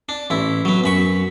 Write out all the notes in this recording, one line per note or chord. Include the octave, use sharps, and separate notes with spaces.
D4
A1 E4
F#3 B3
F#2 B5 C#6